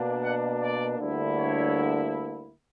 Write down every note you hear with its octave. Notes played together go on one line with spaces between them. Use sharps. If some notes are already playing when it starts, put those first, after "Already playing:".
Already playing: B2 A#3 D4
F#5
D5
D2 D3 G3 A#3 E4
C#5